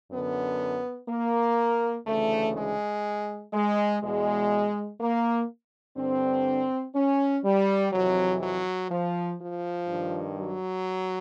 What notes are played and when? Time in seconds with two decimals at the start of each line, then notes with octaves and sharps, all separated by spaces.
0.12 F#2 D3 B3
1.09 A#3
2.07 D2 C#3 E3 A3
2.55 G#3
3.54 G#3
4.02 E2 B2 G#3
5.00 A#3
5.97 G2 D3 C4
6.95 C#4
7.44 G3
7.93 F2 C3 E3 F#3
8.41 F#3
8.90 F3
9.39 F3
9.88 G2 D#3
10.37 F#3